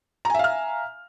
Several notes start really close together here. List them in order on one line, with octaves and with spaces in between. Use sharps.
A#5 G#5 E5 F5 F6